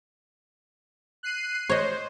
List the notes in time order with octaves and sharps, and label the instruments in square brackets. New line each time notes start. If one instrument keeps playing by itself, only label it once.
[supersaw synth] F#6 C7 D#7
[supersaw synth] C5 [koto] C#5 D#5